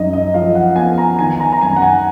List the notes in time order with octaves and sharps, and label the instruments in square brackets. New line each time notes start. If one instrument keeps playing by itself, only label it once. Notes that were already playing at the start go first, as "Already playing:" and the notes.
Already playing: [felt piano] F#2 D#4 [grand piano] D#5
[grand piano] D#5
[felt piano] F3 [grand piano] F5
[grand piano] F#5
[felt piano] B3 [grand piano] G#5
[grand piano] A#5
[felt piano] D#3 [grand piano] G#5
[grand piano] A#5
A#5
[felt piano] F#2 [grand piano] G#5
[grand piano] F#5
G#5